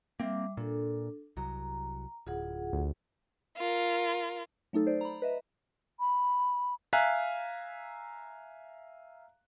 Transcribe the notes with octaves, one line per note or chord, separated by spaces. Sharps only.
G3 A#3 C4 E5 D6
A#2 D4 A4
C2 F#3 A#5
D1 F4 G#4 F#5
D2
F4 A#4
F#3 A3 D#4 A4
C5 D5
A#5 B5
B4 D#5 E5
B5
E5 F5 G#5 A#5 F#6 B6